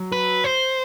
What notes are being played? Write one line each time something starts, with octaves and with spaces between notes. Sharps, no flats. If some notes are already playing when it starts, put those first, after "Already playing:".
Already playing: F#3
B4
C5